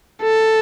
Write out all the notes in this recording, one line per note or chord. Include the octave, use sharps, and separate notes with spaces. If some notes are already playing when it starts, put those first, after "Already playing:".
A4